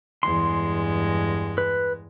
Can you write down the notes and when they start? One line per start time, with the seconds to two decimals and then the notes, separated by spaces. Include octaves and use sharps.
0.23 E2 G2 G#3 C6
1.58 B4